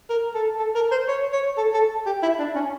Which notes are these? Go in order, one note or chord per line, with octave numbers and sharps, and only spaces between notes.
A#4
A4
A4
A#4
C5
C#5
C#5
A4
A4
G4
E4
D4
C#4